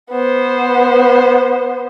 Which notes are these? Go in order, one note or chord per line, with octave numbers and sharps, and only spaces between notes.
B3 C5